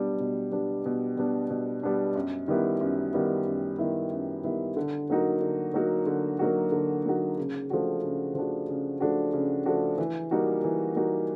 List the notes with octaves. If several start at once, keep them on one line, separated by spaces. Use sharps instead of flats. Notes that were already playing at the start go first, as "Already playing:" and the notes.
Already playing: B2 G3 B3 D4
B2
G3 B3 D4
B2
G3 B3 D4
B2
G3 B3 D4
F#2
D#3 G3 B3 E4
F#2
D#3 G3 B3 E4
F#2
D#3 G3 B3 E4
F#2
D#3 G3 B3 E4
D3
F#3 A#3 D#4 F#4
D3
F#3 A#3 D#4 F#4
D3
F#3 A#3 D#4 F#4
D3
F#3 A#3 D#4 F#4
C#3
F3 A3 D4 F#4
C#3
F3 A3 D4 F#4
C#3
F3 A3 D4 F#4
C#3
F3 A3 D4 F#4
E3
G3 A#3 D#4 F#4
E3
G3 A#3 D#4 F#4